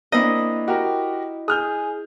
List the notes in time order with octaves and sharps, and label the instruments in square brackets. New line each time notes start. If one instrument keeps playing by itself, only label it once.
[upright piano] A#3 C4 D4 [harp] E4 D#5
[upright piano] F#4 G4 A#4
[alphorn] G#4 [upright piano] D#6 F6 G6